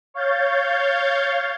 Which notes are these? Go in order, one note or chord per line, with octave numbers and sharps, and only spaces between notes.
C#5 F5 G6 A6